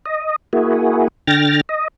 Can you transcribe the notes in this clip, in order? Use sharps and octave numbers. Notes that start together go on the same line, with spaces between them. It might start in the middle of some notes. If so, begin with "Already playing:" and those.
D#5
A#3 E4 F#4 G#4
D3 G5 F6 A6 A#6
D#5